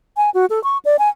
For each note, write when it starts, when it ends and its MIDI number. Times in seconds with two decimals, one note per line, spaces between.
0.17 0.30 80
0.34 0.46 66
0.50 0.62 69
0.64 0.78 85
0.85 0.96 74
0.99 1.09 80